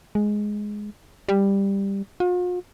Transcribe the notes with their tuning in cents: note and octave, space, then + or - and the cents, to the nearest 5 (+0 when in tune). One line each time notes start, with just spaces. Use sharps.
G#3 +5
G3 +10
F4 +45